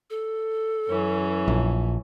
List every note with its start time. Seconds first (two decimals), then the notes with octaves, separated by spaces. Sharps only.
0.10 A4
0.88 F#2 E3 C#4
1.48 A#1